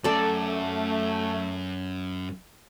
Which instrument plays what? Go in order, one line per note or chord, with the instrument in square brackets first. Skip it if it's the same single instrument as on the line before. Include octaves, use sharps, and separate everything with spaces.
[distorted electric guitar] F#2 [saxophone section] A3 [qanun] A4 D5